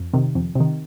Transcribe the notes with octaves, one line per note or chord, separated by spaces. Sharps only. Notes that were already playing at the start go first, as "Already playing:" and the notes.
Already playing: F2
C3 D#3
F2
C3 D#3